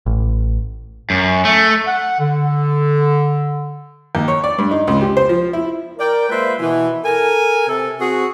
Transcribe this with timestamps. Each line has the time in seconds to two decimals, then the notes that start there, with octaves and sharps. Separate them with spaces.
0.06 A1
1.10 F#2
1.45 A3
1.87 F#5
2.20 D3
4.15 D#2
4.28 C#5
4.44 D5
4.58 G2
4.71 D#4
4.87 C#2
5.01 G4
5.17 C5
5.29 F3
5.53 E4
5.98 A#4 D5 G5
6.29 G#3 A#3 F4 B4 C5 E5
6.59 B2 E3
7.03 A4 A#4 G#5
7.68 C3 A4
7.99 C4 F#4 G#4